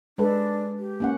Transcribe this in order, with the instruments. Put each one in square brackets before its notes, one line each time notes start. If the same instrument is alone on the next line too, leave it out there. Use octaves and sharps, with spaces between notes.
[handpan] G#3 A4 B4 [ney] D4
[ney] G4
[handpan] A#3 C#4 F#5